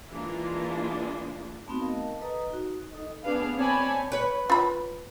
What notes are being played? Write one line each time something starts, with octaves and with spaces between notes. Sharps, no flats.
E3 G#3 A#3 D4 F4
A3 B3 C4 D#4 F#4
A#4 D#5 F5 A5
A4 B4 D#5 A#5 D#6
D#4 F#4
D#4 A4 D#5
B3 D4 G#4 B4 F5
C4 C#5 D5 G#5 A5 B5
B4 C#5
F4 B5